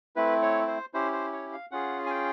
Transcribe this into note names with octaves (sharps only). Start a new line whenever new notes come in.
A3 C4 E4 B4
C#5
C5
C#4 E4 G4 C5
C5
C#5
F5
C#4 F4 G#4 F#5
G#5
G5